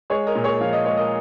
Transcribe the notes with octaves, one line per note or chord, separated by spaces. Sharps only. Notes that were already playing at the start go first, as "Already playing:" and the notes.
G#3 G#4 C#5
A#4 D#5
A#2
G#4 C#5
F3 F5
D#5
G#3 C#5
A#4 D#5